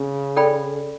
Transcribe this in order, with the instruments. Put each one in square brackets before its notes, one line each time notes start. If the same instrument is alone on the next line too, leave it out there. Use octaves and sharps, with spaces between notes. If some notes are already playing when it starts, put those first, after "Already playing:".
Already playing: [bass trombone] C#3
[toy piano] A4 D5 G5 B5